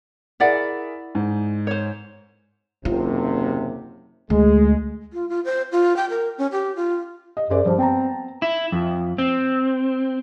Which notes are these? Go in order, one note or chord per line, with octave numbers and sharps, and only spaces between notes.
E4 G#4 A#4 D5 E5 F#5
G#2
C5 C#5
F#1 D#2 C3 F4
D2 G#3
F4
F4
C5
F4
G5
A#4
C#4
G4
F4
D#5
F#2 G#4 C5 D5
G2 F3
B3 C4 A5 A#5
E4
F2
C4